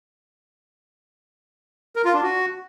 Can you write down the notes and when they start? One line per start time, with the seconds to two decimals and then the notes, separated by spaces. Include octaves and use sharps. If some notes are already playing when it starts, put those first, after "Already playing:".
1.96 A#4
2.05 F4
2.14 D4
2.23 F#4